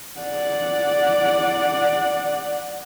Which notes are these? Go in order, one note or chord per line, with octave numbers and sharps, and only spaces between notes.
D5 F#5